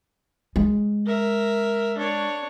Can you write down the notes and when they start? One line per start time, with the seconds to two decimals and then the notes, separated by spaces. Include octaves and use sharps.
0.56 G#3
1.06 A#4 E5
1.98 D4 C#5